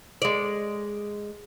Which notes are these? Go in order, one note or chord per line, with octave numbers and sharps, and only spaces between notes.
G#3 D5